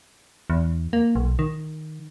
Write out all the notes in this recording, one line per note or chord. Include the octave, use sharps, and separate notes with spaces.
E2
A#3
B1
D#3